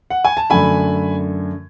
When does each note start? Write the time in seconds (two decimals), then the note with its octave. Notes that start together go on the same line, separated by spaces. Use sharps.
0.10 F#5
0.25 G#5
0.37 A5
0.50 F#2 D3 A3 G#5 B5